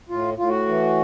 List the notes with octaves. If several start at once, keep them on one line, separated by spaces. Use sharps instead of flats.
A2 F4
A2 F4
F#4
E3